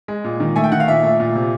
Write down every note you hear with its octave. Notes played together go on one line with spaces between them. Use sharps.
G#3
A#2
D#3
A3 G#5
G5
D#3 F#5
F5
A#2 E5
A3
A#2
C3